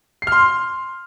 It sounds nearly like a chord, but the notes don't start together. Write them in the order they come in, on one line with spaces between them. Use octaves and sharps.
C7 F6 C6